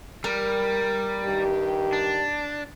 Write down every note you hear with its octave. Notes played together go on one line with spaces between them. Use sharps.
G3 A#4
G2 D#3 G4
D4